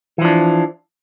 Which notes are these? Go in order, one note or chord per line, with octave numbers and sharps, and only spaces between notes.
E3 F3 D4